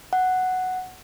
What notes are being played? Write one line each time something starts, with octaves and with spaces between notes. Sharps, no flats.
F#5